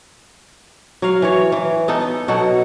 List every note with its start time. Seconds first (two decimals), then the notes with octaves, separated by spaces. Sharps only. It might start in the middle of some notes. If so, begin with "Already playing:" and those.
1.02 F#3 F5
1.22 E3 C#5
1.52 E3
1.88 B3 D#4 A4
2.28 B2 F#3 A4 F#5